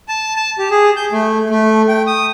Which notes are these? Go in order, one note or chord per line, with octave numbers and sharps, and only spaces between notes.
A5
A5
G4
G#4
G6
A3
A3
G5
D#6